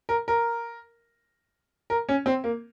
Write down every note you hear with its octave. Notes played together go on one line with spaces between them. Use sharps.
A#4
A#4
A#4
C#4
C4
A#3